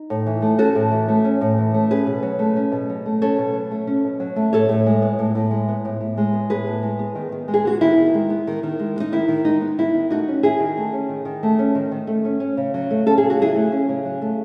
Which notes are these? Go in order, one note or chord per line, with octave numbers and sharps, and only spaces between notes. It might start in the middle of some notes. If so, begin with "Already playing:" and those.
Already playing: D#4
A2
E3
A3
C#4 F#4 A4
A2
E3
A3
C#4
A2
E3
A3
C#4 G#4 B4
B2
F#3
A3
C#4
B2
F#3
A3
C#4 A4 C#5
B2
F#3
A3
C#4
B2
F#3
A3
A2 A4 C#5
A2
G#3
B3
A2
A2
G#3
B3
A2
A2
G#3
B3
A2 G#4 B4
A2
G#3
B3
D#3
D#3
G#3
G#4
B3 F#4
D#3 E4
D#3
G#3
B3
D#3
D#3
G#3
B3
D#4
D#3 E4
D#3
G#3 D#4
B3
D#3 E4
D#3
A3 D#4 F#4
C#4
D#3 E4 G#4
D#3
A3
C#4
D#3
D#3
A3
C#4
D#3
D#3
A3
C#4
C#4
C#3
F#3
A3
C#4 A4
G#4
C#3
F#4
F#3 E4 G#4
A3
C#4
C#3
F#3
A3